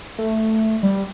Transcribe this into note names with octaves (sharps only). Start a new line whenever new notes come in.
A3
G3